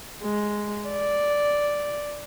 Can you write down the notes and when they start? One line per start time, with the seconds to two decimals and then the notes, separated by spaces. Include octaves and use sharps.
0.23 G#3
0.89 D5